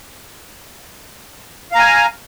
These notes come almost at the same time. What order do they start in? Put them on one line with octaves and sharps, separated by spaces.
F5 A#5 G#5